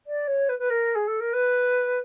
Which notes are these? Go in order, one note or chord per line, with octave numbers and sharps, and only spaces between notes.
D5
C#5
B4
B4
A#4
G#4
A4
A#4
B4